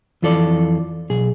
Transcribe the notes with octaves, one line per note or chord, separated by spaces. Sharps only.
F2 E3 F4 A4 C#5 D5
B1 G#4